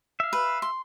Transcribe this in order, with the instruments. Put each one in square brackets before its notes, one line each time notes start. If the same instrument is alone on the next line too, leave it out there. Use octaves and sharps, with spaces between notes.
[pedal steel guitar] E5 F5
[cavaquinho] B4
C6